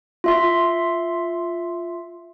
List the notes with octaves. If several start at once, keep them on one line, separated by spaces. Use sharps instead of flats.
F4 E5 C6